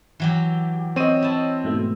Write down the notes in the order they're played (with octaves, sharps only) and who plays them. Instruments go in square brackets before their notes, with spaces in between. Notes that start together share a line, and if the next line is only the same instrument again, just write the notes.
[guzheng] E3 F#3 G4
[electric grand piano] C4 D#7 [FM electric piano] C#5 D#5
[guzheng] E4 A5
[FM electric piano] G#2 B2 A3